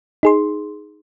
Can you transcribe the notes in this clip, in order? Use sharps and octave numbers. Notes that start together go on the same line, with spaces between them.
D#4 G#4 C6